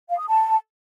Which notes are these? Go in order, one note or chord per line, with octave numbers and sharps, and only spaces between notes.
F5
D#6
A5